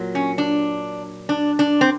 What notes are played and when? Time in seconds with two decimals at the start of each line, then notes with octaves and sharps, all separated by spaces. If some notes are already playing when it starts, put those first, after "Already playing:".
Already playing: A#2 F#3
0.15 C#4
0.38 D4
1.29 D4
1.59 D4
1.81 C4